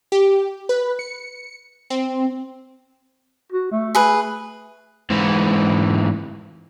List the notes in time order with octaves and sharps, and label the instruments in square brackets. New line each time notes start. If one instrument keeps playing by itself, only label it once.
[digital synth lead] G4
B4
C#7
C4
[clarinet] F#4
A3
[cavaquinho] G#4 B4
[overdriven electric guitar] G#2 E3